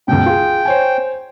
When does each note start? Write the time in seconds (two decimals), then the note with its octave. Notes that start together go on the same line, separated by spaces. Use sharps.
0.08 C#2 F#2 B2 G5
0.26 F4 G#4
0.65 C5 C#5 G#5